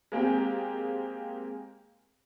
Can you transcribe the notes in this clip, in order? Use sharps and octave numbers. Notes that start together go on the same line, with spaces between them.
G#3 A#3 C4 G4